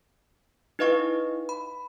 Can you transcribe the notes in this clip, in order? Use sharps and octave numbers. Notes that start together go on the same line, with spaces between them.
D#4 E4 B4 D#5 F5 C#6
B5